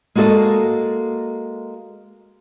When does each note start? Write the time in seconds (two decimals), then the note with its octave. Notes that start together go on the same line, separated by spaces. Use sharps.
0.15 G#3 A#3 F#4 A4 D#5